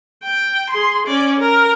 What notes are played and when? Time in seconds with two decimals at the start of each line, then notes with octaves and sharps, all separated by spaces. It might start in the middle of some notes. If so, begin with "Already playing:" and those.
0.23 G5
0.70 G#4 C6
1.07 C#4 D5
1.40 A#4